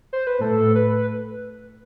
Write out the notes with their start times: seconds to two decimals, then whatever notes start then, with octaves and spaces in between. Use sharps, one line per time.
0.13 C5
0.27 B4
0.41 A2 A4
0.75 B4